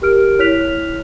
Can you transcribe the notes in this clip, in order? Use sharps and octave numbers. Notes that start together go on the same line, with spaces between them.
G4 A#4 F6 D7
E4 C#5 F6 F#6 B6 F7